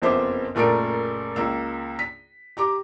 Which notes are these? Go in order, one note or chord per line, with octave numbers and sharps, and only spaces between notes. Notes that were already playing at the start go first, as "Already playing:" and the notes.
F#1 F2 B3 C5 E5 D6
F#1 A#2 A3 A#4 G5 D7
C#2 A#3 E6
B6
G4 A#5 D6